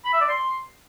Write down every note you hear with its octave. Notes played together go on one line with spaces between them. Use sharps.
B5
E5
D5
C6